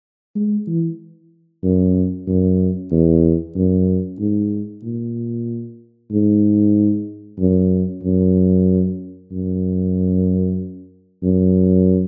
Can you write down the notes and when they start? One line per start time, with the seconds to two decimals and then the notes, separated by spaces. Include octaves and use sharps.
0.35 G#3
0.67 E3
1.63 F#2
2.27 F#2
2.91 E2
3.56 F#2
4.19 G#2
4.83 A#2
6.12 G#2
7.40 F#2
8.03 F#2
9.32 F#2
11.23 F#2